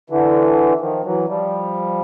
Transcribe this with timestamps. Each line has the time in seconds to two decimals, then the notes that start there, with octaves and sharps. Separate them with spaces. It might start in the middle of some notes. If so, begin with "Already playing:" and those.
0.10 D3 E3
0.81 D#3 F3
1.05 E3 F#3
1.28 F3 G3